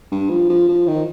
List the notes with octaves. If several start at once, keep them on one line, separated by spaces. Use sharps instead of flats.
G2
F3
F3
F3
D#3